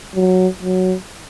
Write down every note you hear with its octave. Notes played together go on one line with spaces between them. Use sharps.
F#3
F#3